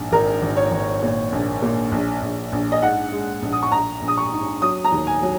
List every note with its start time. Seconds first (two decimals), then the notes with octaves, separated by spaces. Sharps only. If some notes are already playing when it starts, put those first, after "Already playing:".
Already playing: A#1 G#2
0.12 G#1 A#4
0.42 G#1
0.57 C#5
0.71 G#1
1.02 A#2
1.32 A#1
1.62 A#2
1.92 A#1
2.22 A#1
2.52 A#1
2.72 D#5
2.82 G#2 F#5
3.12 G#3
3.42 A#1
3.52 D#6
3.63 C#6
3.72 A#1 A#5
4.02 A#1
4.08 D#6
4.17 C#6
4.32 G#2
4.62 F#3 D#6
4.84 A#5
4.92 D#2
5.07 G#5
5.23 F#3